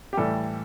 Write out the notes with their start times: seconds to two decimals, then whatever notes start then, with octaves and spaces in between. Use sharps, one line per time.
0.13 G4
0.17 A2 E3 G3 A4